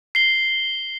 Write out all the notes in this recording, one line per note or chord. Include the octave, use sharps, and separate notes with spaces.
C7 G7